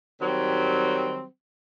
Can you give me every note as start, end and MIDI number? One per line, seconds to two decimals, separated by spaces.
0.20 1.25 51
0.20 1.25 54
0.20 1.25 55
0.20 1.25 60